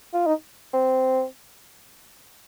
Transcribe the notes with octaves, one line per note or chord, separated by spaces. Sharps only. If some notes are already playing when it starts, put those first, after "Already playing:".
F4
D#4
C4